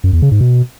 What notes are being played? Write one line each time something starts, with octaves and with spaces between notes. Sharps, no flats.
F#2
E2
C#3
G#2
B2